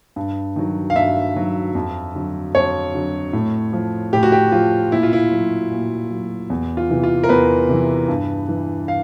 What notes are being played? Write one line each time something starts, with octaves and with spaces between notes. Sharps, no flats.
G2
D#3 F#3
F5
G2 E5
D#3 F#3
F2
D3 F#3
F2 C#5
D3 F#3
A2
F3
A2 G4
F#4
G4
F3 F4
A#2 E4
F4
E4
F#3
A#2
F#3
E2
F4
C3 E3
F4
A#4
E2 B4
C3 E3
G2
E3
F5